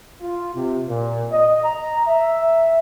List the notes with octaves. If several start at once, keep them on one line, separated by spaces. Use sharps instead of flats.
F4
C3
A#2
D#5
A#5
E5